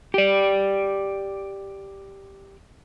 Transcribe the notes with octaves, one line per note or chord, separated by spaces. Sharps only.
G4 D5